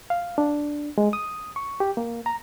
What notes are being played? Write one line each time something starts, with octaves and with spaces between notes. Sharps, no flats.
F5
D4
G#3
D#6
C#6
G4
A#3
A#5